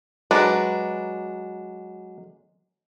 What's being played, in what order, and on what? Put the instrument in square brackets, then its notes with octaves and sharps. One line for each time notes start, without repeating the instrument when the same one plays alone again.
[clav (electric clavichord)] F#3 G#3 A#5 [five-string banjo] D4 B4